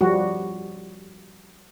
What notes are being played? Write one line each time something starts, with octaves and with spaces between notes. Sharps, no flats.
F3 G3 F#4